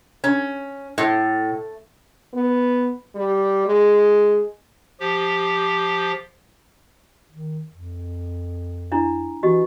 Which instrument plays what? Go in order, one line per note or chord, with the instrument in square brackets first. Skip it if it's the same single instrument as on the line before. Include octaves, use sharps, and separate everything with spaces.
[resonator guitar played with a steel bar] C#4
A2
[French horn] B3
G3
G#3
[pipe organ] F3 G4
[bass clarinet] D#3
F2
[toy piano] D4 E4 A#5
[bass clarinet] E3 [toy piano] F#4 G4 D#5